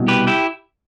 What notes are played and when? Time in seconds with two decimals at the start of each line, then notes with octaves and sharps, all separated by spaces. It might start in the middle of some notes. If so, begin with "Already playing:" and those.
Already playing: C2 B2
0.08 G4 B4
0.27 E4 G4